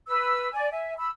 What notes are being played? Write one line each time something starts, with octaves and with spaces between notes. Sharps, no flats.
B4 E6
D5 G#5
E5 G#5
B5 E6